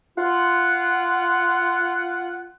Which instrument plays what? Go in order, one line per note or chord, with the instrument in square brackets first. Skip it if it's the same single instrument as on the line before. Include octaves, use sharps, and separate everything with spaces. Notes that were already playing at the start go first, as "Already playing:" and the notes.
[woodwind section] F4 F#5